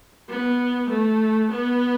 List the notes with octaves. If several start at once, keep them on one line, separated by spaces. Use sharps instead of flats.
B3
A3
B3